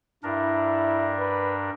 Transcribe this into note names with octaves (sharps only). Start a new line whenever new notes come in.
G2 D4 E4 A#4
B4